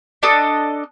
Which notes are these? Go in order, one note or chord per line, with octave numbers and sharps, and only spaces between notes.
D4 A4 D#5